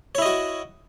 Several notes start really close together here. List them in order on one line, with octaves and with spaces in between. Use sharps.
C#5 E4 D#5 F#4